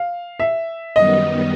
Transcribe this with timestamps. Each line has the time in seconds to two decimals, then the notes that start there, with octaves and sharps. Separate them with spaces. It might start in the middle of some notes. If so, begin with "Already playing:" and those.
Already playing: F5
0.40 E5
0.95 F#2 D#3 G3 B3 D#4 D#5